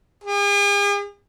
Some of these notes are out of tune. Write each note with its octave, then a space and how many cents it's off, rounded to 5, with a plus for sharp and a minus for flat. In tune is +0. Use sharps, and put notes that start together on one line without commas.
G#4 -45